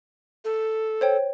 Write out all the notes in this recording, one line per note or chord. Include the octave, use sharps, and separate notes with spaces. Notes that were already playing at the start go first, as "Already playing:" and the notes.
A4
C5 C#5 G5